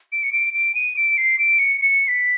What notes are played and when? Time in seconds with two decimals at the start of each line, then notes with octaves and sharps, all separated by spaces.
0.12 D7
0.23 C#7
0.33 D7
0.54 D7
0.75 D#7
0.96 D7
1.17 C7
1.39 D7
1.59 C#7
1.81 C#7
2.08 B6